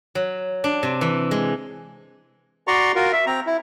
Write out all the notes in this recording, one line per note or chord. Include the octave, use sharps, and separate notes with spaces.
F#3
D4
C3
E3
G#3
F#4 D5 A#5 C6 C#6
F4 F#4 A#4
E5
C4 A#5
E4